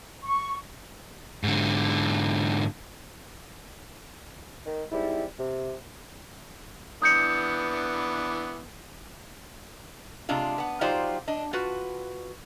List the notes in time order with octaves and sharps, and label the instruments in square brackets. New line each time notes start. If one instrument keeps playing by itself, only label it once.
[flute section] C#6
[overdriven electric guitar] G#2 D3
[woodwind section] D#3
G#2 G3 C4 E4
C3
[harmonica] E3 B3 D4 [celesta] D#6 G6 C#7
[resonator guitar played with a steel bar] C3 G#3 D4 F4
B3 F#5
F#3 D#4 F4 G4 C5 D5
D4 D#5
F4 F#4 B4